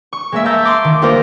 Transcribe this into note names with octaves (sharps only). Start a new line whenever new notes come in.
C#6
G#3 A#3 E5
E5 A5 A#5 E6 G6
C6 D6
D#3
G3 A#3 F4 A#4 C5